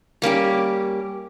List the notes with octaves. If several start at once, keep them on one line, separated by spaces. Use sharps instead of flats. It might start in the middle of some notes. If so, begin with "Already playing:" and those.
G3 A#3 C#4 G4